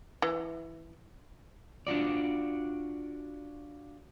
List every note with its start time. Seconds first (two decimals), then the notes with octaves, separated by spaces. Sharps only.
0.22 E3
1.87 D4 F4 F#4 D5